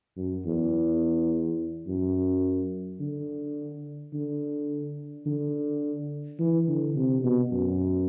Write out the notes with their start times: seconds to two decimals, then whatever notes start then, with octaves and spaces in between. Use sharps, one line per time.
0.17 F#2
0.46 E2
1.87 F#2
3.00 D3
4.14 D3
5.26 D3
6.39 E3
6.68 D3
6.96 C3
7.24 B2
7.52 F#2